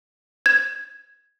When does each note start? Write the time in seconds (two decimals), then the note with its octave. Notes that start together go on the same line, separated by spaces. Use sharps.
0.46 G#6